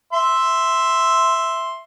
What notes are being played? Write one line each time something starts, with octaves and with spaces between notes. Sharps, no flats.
E5 C6